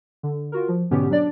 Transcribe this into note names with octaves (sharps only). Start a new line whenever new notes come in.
D3
F4 F#4 A#4
F3
G#2 B2 D3 B3 C#4 G4
F#3 D4 D5